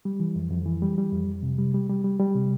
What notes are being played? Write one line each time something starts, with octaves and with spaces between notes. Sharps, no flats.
G3
E3
F2
F2
E3
G3
G3
F2
F2
C3
G3
G3
G3
G3
G3
C3